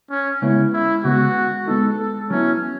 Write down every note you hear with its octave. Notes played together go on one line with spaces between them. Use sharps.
C#4
C#3 G#3 B3 C#4 E4
E4
C#3 G#3 B3 F#4
G#3 B3 D#4 A4
A4
F#3 B3 C#4 E4